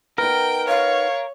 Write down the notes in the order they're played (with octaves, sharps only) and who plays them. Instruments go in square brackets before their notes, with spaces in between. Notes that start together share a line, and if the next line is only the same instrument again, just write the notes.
[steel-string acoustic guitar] B3 D#4 B4 [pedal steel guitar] A#4 [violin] G5
[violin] C#5 [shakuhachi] F5